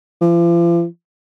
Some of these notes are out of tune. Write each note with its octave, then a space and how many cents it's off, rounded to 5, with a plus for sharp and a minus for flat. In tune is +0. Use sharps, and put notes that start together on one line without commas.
F3 -40